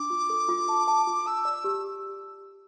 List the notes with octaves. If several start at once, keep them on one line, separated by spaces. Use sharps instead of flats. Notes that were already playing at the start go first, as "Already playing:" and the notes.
Already playing: D4 D6
F4
A4
F4
A5
A5
F4
A5 E6
D5
G4